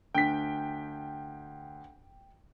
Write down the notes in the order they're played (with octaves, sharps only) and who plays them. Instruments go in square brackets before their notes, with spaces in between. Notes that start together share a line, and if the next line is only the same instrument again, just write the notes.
[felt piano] D2 [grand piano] G5 B6